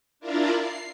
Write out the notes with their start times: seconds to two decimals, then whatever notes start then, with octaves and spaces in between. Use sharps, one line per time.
0.20 D4 E4 F4 A#4 D5
0.57 C7